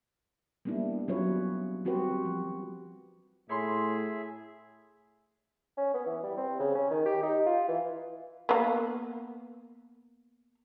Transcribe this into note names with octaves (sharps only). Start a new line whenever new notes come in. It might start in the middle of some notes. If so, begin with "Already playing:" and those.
G3 A#3 B3 D4 E4
F#3 B3 C#4 F4 B4 C#5
G3 C4 F#4 G4 B4 C5
F3
A2 G#4 C#5 E5 B5 C6
C#4
B3
E3
G3
C4
C#3
C#4
D#3
G4
D#4
F4
E3
A#3 B3